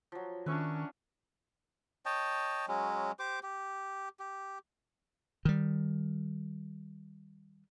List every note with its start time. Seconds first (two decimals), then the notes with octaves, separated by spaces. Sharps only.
0.12 F3 F#3
0.46 D#3 C#4 D4 B4 E5 C#6
2.06 C#5 D#5 G5 A5
2.68 F#3 G#3 C#4
3.19 G4 C5 D6
3.43 G4
4.19 G4
5.45 D#3 G3